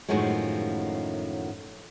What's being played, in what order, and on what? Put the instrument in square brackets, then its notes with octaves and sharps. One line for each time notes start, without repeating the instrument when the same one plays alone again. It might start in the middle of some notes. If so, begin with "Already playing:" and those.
[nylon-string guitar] F#2 A2 D#3 F3 F#3 G#3